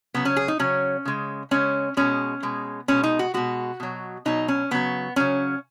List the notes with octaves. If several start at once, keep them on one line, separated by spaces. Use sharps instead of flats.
C#3 F#3 B3
C#4
G#4
D#4
C#3 F#3 C#4
C#3 G#3
C#3 G#3 C#4
B2 G#3 C#4
B2 G#3
B2 G#3 C#4
D#4
F#4
B2 G#3 F#4
B2 F#3
B2 F#3 D#4
C#4
C#3 F#3 B3
C#3 F#3 C#4